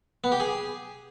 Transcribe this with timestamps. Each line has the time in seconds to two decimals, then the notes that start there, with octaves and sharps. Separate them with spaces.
0.24 B3
0.32 G4
0.40 G#4